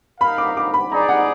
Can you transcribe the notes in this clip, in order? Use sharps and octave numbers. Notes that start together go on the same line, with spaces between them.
D#4 A#4 F5 B5
D6
D6
B5
D#4 G#4 D5 A#5
F#5